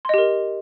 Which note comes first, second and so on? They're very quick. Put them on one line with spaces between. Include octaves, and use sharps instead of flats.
C6 D#5 G4 A#4